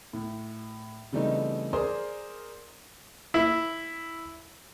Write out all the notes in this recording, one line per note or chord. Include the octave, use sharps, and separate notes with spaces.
A2
C#3 E3 G3 A3 C4 D#4
G#4 A#4 C5 D5 C6 D#6
E4